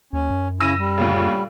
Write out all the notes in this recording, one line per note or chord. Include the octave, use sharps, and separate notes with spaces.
D#2 C#4
F#2
C#3 C#4 E4 E6 A#6 D#7
G3
D2 A#2 C#3